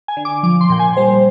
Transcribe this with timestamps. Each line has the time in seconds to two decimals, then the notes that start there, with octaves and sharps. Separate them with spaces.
0.08 G#5
0.17 D3
0.25 D6
0.43 F3 D6
0.61 C6
0.70 A#2 G5
0.79 G#5
0.97 G3 C5